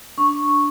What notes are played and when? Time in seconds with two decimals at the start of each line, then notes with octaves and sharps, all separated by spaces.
0.18 D4 C#6